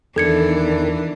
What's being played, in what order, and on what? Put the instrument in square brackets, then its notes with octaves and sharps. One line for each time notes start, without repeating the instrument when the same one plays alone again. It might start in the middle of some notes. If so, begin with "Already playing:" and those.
[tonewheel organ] E2 D#3 [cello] E3 D4 [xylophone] A4 G#6 C#7